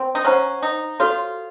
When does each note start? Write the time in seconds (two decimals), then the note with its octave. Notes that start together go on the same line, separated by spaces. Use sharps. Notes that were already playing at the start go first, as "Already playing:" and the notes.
Already playing: C4
0.15 D#4
0.25 C#4 C5 F#5 A#5
0.63 D#4
1.00 F4 F#4 A4 C#5